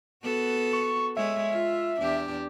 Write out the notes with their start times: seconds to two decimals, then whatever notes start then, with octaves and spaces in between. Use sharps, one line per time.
0.23 B3 F#4 A4
0.73 C#6
1.17 G#3 C#5 E5
1.50 F4
2.00 E2 D4 G4